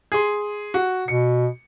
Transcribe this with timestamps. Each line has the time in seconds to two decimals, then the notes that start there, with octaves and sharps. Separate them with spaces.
0.12 G#4 C6
0.74 F#4
1.08 B2 C#7